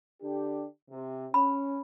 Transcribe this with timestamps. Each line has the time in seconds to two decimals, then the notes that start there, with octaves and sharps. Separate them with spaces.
0.22 D3 D4 G4
0.90 C3
1.34 C#4 B5